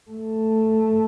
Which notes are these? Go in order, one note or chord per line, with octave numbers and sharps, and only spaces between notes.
A3